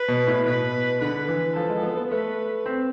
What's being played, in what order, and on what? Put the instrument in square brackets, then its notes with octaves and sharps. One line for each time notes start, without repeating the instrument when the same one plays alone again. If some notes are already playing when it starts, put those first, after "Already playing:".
Already playing: [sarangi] B4
[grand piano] B2
A2
[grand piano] B2 [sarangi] B4
[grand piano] D3 [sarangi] B4
[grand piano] E3
[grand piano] F3 [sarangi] A4
[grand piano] G#3
B3
B3
[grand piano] A3 [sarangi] B4
[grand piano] C4